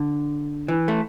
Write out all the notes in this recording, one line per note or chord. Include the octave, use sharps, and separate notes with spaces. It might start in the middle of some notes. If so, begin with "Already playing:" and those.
Already playing: D3
E3
A3